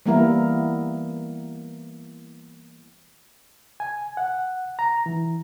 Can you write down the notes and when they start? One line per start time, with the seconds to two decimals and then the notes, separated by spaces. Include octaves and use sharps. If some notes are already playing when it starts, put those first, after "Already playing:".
0.06 E3 G3 A#3 B3 E4 A#4
3.80 G#5
4.17 F#5
4.79 A#5
5.06 E3